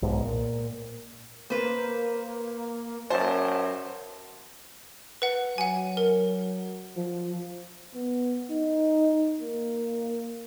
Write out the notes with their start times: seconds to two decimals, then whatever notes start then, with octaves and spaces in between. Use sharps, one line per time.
0.02 B1 G#2
0.23 A#2
1.50 A#3 B4 C5
3.10 F#2 C5 A5
5.22 B4 F#5
5.58 F#3 F#5 G#5
5.97 A#4
6.97 F3
7.95 B3
8.51 D#4
9.41 A#3